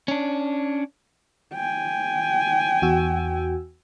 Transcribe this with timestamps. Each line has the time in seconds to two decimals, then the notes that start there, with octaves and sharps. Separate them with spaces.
0.08 C#4 D4
1.54 G5 G#5
2.82 E2 F#4 E6